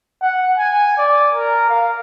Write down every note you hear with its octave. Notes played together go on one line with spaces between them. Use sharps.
F#5
G#5
D5
A#4
F5